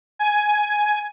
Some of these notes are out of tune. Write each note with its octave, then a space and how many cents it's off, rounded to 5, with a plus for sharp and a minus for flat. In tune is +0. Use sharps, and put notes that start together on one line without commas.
G#5 +10